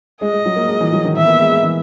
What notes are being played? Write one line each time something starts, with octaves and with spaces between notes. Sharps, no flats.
G#3 D#5
G#3
F#3
A#3
G#3
E3
F#3
D#3
E3 E5
B3
A#3
G#3
G#3
E3